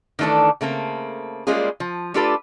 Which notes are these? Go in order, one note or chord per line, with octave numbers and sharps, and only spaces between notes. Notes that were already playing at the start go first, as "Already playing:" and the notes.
D#3 E3 A3 D4 A4
C#3 A3 A#3 C4
G3 G#3 A#3 C#4 F4 G#4
F3
A3 D4 F4 G4 A4 B4